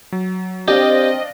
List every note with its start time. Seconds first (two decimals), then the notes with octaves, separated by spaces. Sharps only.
0.12 F#3
0.68 C4 D4 G4 D5 D#5 F5